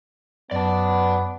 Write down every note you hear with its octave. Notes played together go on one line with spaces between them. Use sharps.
F#2 B3 D5 A5